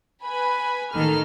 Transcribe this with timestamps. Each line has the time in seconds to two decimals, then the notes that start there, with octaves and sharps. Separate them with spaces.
0.23 B4 G#5 B5
0.92 A1 D#3 A#3 A4 F6